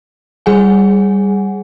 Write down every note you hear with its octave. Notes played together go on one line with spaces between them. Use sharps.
G3 G#4 F#5 G#5